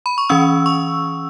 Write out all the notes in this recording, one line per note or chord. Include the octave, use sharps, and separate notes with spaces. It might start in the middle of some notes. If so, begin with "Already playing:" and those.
B5
C#6
E3 C#4 E6
C#6